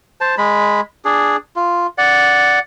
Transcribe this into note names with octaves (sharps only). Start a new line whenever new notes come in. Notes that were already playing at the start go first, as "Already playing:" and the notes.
C5 A5
G#3 B5
D4 G#4
F4
D5 F#5